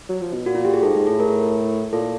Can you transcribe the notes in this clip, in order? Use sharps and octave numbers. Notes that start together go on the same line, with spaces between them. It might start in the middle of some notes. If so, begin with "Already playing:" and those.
F#3
F3
B2
A#2 F#4
F4
G4
G#4
G#2 A4
G#2 G#4
A2 A4
A#4
A#2 A4